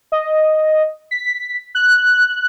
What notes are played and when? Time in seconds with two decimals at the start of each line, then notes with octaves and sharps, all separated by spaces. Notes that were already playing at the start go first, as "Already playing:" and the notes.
0.12 D#5
1.11 B6
1.75 F#6